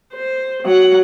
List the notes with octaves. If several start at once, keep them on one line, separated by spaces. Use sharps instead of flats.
C5
F#3 F#5